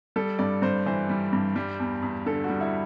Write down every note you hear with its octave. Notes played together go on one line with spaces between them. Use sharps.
G3 A4
G2 D5
G2 C5
E3 C5
G3
G2
G3
E2
E2
D3 A4
F#4
G3
E4